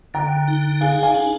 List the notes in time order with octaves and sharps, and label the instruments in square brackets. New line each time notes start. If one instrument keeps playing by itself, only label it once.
[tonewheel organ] D3 [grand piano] G5 A#5
[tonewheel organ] D#4
[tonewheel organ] G#4 [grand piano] F5 G#5
[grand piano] F5 G#5
[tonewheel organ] D4